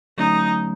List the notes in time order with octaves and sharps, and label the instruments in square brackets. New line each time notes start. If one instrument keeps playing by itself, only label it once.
[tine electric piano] D3 F#3 A3 C#4 [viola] D#4